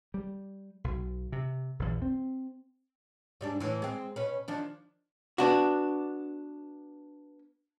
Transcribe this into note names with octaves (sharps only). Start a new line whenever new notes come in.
G3
B1
C3
A#1 E2
C4
G#2 G3 D4
A2 E3
G#3 C4
B2 C#4 B4
D#3 F3 D4
B3 D4 F#4